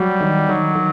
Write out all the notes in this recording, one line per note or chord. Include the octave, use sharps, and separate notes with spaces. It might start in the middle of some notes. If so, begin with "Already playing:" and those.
Already playing: F#3 G3
D#3
D#3 F#3
D#3